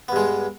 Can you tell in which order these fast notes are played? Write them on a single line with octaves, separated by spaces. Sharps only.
B3 G2 G#3